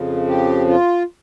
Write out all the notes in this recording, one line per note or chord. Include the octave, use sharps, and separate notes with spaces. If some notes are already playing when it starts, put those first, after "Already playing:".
Already playing: F2 C#3 F3
G4
F4